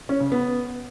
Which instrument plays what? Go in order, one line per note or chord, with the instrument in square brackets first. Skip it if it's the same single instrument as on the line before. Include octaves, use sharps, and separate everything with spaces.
[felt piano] C#4
C#3
B3